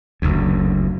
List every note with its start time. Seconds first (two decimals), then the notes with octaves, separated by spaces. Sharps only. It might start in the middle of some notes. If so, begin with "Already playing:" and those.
0.22 F#1 D2